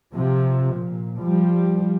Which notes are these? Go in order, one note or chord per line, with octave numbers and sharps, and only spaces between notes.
C3 F3
A#2
F3 G3